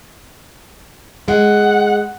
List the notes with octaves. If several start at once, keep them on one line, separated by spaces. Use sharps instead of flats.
G#3 F#5